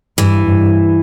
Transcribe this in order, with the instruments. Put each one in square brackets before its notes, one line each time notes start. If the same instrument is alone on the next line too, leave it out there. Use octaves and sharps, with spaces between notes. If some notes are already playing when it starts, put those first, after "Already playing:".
[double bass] G2 [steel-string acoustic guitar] E3
[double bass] G2